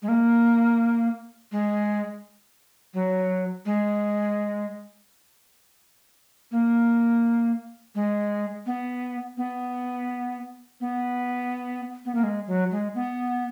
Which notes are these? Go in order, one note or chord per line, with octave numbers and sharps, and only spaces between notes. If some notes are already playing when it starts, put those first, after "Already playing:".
G#3
A#3
G#3
F#3
G#3
A#3
G#3
B3
B3
B3
B3
A#3
G#3
F#3
G#3
B3